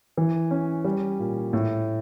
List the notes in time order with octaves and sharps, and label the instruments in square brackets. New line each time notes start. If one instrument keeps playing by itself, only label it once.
[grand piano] E3
C#4
G3
A#2
A2